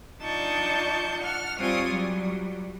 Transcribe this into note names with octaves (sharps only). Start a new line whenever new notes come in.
D4 D#4 F4 A5 C#6 G6
F#5 F6
G3 C4 F4 C#5 G#5 D#6
F#3 G3